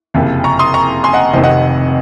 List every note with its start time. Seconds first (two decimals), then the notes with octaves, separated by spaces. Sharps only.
0.14 F#1 F2 C3
0.44 A#5 C#6
0.59 C6 D#6
0.74 A#5 C#6
1.04 G#5 C6
1.13 D#5 F#5
1.33 F1 F2 C3 D#3 C5 D#5
1.44 D#5 F#5